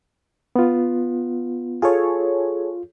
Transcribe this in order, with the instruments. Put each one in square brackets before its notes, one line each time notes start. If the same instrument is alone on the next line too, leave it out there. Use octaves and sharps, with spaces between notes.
[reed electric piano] B3 F4
[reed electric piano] F4 [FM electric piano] G#4 A4 C#5